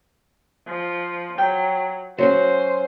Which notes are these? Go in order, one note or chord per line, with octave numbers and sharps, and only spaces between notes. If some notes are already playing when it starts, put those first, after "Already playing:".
F3
F#3 G5
F#3 C#4 F#4 C5